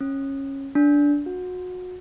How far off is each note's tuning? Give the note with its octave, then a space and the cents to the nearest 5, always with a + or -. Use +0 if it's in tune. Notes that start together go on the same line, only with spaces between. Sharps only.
C#4 -20
D4 -15
F#4 -25